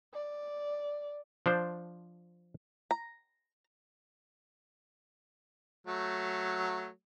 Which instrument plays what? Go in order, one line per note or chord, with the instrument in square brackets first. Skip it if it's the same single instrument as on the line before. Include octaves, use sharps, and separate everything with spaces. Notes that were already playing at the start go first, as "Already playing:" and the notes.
[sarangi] D5
[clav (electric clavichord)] F3 D4 C5
[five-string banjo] A#5
[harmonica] F#3 A3